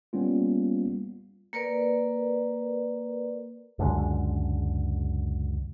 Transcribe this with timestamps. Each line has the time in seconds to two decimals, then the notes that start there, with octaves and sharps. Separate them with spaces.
0.13 G3 A#3 B3 C#4 F4
1.53 A#3 A#4 B4 D5
3.79 C#2 F#2 D3 G#3